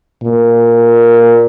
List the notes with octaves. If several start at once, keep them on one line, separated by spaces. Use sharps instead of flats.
A#2